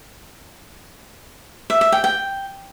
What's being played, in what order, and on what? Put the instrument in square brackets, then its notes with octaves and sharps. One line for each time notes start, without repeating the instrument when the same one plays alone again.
[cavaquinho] E5
E5
G5
G5